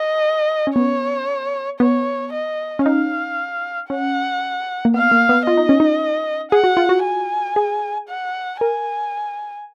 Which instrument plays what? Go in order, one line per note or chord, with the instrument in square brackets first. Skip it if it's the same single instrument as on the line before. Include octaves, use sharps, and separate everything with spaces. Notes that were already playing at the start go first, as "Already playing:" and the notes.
Already playing: [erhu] D#5
[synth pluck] C#4
[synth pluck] B3 [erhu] C#5
[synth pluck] B3 [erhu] C#5
[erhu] D#5
[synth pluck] C#4
[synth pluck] D#4 [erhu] F5
[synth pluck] C#4 [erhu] F#5
[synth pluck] A#3
[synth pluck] B3 [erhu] F5
[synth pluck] A#3
B3
[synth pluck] F4 [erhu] D#5
[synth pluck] D#4
C#4
D#4
[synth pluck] G#4 [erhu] F#5
[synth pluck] F#4
F4
F#4
[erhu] G#5
[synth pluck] G#4
[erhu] F#5
[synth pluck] A#4 [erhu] G#5